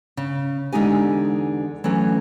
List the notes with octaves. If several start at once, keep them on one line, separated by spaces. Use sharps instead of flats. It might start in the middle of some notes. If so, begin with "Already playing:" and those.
C#3
E2 D3 G#3 D#4 G4 G#5
E3 F#3 A3 C#4